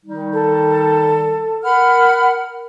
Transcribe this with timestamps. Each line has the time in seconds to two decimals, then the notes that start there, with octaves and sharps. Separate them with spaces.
0.05 D#3 G3 D#4
0.32 A4
1.64 A#4 F#5 B5 F6